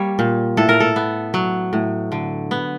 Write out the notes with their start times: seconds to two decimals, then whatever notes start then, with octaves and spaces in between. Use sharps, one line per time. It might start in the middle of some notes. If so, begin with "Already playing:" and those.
Already playing: G3 A#3 C#5
0.19 A#2
0.57 A2 A4
0.69 A#4
0.80 A4
0.96 B3
1.34 F#3
1.73 A2
2.12 D3
2.51 B3